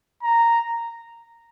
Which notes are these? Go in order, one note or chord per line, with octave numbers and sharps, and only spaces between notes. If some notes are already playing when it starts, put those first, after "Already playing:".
A#5